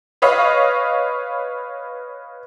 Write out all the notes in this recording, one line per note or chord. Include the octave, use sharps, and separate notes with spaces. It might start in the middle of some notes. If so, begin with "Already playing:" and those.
B4 C#5 D#5 F5